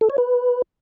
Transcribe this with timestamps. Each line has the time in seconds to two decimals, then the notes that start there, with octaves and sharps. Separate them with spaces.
0.01 A4
0.10 C#5
0.18 B4